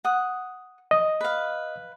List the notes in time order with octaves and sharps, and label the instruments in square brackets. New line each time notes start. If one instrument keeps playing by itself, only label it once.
[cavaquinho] F#5 D#6
[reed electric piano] D#5
[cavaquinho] B4 F5